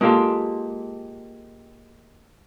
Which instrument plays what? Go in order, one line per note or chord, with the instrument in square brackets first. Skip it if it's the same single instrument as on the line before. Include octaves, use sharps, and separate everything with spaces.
[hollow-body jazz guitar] G#3 A#3 F4 G4 A4 C6